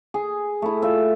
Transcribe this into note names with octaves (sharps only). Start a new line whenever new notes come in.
G#4
A3 E4
F4 E5